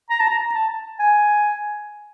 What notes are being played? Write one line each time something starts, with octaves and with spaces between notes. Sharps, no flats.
A#5
A5
A#5
A5
G#5